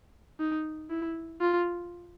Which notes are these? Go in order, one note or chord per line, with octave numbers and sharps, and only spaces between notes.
D#4
E4
F4